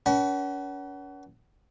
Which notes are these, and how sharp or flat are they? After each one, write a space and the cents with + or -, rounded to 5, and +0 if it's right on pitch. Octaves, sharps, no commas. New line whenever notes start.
C#4 +40 B4 -45 F#5 +25